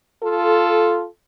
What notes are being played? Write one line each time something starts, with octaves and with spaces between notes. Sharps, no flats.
F4 A4